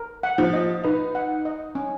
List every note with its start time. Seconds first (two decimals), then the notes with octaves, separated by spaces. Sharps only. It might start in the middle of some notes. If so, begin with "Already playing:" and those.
Already playing: A#4
0.23 F#5
0.38 F3
0.53 D#5
0.84 D#4 B4
1.15 F#5
1.45 D#5
1.75 C#4